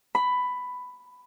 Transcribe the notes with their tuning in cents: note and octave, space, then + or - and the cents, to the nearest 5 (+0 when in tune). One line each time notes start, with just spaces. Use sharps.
B5 +10